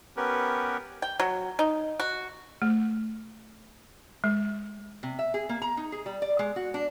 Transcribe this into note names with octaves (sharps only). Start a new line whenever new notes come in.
B3 C#4 G4 A#4 B4
G5
F#3
D#4
F#4
A3
G#3
C3
E5
G#4
A#3
A#5
D#4
G#4
G3
D5
G#3
F#4
D4